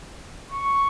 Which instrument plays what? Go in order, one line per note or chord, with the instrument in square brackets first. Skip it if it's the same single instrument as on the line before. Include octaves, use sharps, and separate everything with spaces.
[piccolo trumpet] C#6